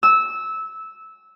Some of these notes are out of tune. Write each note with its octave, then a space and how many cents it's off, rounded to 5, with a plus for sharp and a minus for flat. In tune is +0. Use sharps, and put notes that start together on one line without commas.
E6 -15